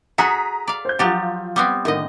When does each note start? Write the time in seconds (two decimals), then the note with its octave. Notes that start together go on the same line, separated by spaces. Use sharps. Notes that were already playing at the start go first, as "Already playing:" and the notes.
0.18 F#4 G#4 A4 A#5 D#6 B6
0.68 D5 F5
0.85 C5 G6
0.99 F3 F#3 F4 G4 A6
1.56 G3 B3 C4
1.85 A2 D3 D#3 D#5